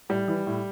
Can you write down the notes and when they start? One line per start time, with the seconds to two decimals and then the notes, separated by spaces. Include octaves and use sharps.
0.09 A2 G3
0.28 E3
0.47 A2